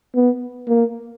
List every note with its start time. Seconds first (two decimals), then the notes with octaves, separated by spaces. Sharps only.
0.15 B3
0.68 A#3